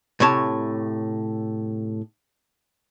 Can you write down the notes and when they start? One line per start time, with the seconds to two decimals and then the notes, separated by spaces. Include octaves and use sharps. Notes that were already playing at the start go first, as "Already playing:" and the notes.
0.20 A2 C3 C#5 A5